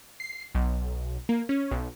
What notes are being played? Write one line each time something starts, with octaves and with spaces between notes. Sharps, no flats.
C7
B1
A#3
C#4
B1